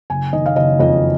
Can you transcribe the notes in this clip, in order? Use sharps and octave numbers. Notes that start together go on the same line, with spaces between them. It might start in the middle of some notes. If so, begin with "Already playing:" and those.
F#1 G#5
D#3 D#5
F5
F#1 D#5
F2 D#5